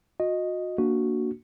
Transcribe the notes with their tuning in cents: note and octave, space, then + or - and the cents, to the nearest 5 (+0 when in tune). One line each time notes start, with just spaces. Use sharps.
F#4 -35 D#5 +0
A#3 +0 D4 +0 F#4 +0